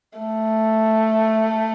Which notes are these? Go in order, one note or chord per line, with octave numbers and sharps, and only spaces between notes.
A3